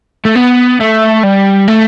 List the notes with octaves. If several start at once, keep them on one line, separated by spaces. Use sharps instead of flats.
A3
B3
A3
G3
A3